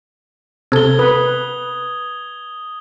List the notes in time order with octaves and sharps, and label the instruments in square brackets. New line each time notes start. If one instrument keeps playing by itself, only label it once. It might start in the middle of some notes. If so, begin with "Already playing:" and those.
[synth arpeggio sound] C3 A4 [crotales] G#6 G7
[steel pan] B4 [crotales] D#6